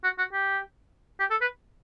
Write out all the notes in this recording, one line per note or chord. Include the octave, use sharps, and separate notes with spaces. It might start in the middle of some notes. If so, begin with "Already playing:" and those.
F#4
F#4
G4
G4
A4
B4